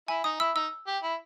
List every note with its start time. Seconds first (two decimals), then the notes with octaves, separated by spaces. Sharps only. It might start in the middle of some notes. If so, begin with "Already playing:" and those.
0.08 E4 G#5
0.24 D#4 D#6
0.40 E4 E6
0.56 D#4 E6
0.87 G4
1.03 E4